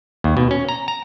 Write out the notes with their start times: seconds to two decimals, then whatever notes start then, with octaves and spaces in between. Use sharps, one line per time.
0.24 D#2
0.37 B2
0.51 C#4
0.69 A#5
0.88 A#5